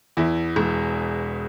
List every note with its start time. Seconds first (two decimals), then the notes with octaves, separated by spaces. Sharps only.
0.17 E2 E4
0.56 E1